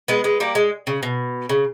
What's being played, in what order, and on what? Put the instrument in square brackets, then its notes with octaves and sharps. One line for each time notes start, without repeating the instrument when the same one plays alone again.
[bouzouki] G#3 B3
G#3 B3
G3 A#3
G#3
C#3
B2
C#3